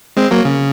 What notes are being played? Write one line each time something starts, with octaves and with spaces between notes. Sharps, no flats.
G#3 C4
F#3 A#3
C#3